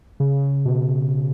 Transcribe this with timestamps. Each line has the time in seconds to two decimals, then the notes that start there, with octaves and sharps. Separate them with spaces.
0.20 C#3
0.65 B2